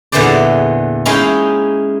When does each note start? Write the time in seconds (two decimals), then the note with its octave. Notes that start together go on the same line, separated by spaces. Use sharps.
0.12 E2 A#2 D3 E3 C5 D5
1.05 G#3 C#4 D#4 E4 F5 G5